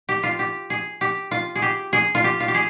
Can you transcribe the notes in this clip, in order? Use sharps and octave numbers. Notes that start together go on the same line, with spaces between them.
G4
F4
G4
G#4
G4
F4
G#4
G4
G#4
F4
G4
F4
G4
G#4